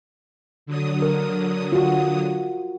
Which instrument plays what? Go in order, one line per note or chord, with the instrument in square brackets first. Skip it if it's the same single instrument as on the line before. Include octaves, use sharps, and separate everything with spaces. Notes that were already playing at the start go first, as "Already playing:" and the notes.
[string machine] D3 F#3 D#6
[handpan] A#4
F4 F#4